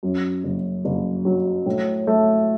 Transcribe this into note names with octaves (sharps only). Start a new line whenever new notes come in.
F#2
F#1
F#1
F#3
A2
A3